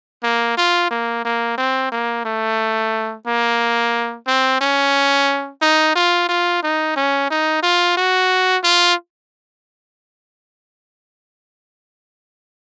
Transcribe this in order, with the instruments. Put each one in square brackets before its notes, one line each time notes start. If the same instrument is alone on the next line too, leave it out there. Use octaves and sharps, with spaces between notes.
[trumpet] A#3
F4
A#3
A#3
C4
A#3
A3
A#3
C4
C#4
D#4
F4
F4
D#4
C#4
D#4
F4
F#4
F4